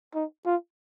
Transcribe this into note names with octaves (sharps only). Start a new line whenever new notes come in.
D#4
F4